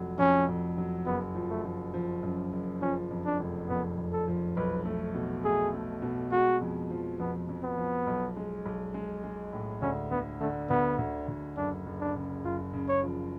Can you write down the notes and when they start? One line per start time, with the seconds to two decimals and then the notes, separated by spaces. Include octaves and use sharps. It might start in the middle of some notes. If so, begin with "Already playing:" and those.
Already playing: F1 F2 F#3
0.19 F2 C#4
0.49 F2
0.78 F#3
1.06 F#1 B3
1.35 F3
1.50 A3
1.65 F3
1.94 F3
2.23 F#2
2.52 F#1
2.81 F3 C#4
3.11 F2
3.26 D4
3.39 F1
3.69 F2 B3
3.98 F1
4.13 A4
4.28 F3
4.56 B1 B4
4.85 A3
5.14 B2
5.44 A3 G#4
5.74 A3
6.02 B2
6.31 G#3 F#4
6.61 F2
6.90 F3
7.19 F2 B3
7.49 F2
7.63 B3
7.77 F3
8.07 B1
8.36 G#3
8.66 B1
8.94 G#3
9.23 G#3
9.53 A2
9.82 D2 C#4
10.11 D3 B3
10.40 D3 A3
10.70 D2 B3
10.98 D2
11.28 D2
11.57 F#1 D4
11.86 F#1
12.01 D4
12.15 C#3
12.45 F#1 F4
12.73 C#3
12.88 C#5
13.03 F3